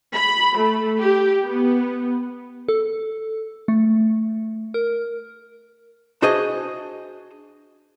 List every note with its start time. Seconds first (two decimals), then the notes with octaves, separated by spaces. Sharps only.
0.15 B5
0.60 A3
1.00 G4
1.45 B3
2.69 A4
3.68 A3
4.74 A#4
6.22 D4 F#4 G#4 C5 D#5